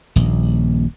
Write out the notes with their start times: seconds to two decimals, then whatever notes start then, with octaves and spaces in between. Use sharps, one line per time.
0.16 D#1 A#1